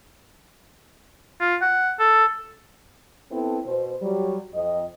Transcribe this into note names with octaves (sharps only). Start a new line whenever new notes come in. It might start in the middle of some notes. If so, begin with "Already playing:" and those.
F4
F#5
A4
B3 C4 E4 A4
B2 C5
F#3 G3
F2 D#5